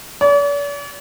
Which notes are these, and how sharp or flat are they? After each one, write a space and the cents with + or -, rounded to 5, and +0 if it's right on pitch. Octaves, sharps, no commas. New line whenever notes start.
D5 -45